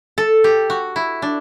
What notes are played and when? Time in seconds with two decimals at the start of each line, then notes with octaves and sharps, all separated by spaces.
0.18 A4
0.44 G4
0.70 F#4
0.96 E4
1.22 D4